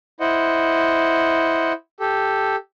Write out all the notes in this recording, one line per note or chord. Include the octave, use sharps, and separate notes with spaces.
E4 C5 D#5 F#5
G4 A4